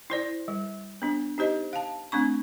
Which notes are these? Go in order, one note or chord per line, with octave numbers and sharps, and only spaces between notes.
E4 C5 D5
G3
B3 D4
D#4 G4 C5 D#5
F5 A5
A3 C4 D4 C#6